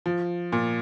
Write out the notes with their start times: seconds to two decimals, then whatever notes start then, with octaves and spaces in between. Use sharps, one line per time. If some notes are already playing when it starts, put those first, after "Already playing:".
0.06 F3
0.52 A#2